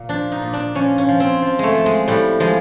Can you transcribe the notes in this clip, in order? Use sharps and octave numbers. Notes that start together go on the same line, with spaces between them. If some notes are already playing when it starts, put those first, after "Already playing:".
Already playing: A#2
F3 D4
D#4
A#2
D4
F3 C#4
C#4
F3
C4
F3
G#3 A3
F3
G#3
A2 G3
F3 G#3